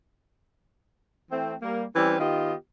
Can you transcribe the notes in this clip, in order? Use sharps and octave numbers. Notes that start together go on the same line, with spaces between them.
E3 A3 C4
G3 A#3
E3 G3 C4 C#4 B4
D#3 B3 F4 G4 D#5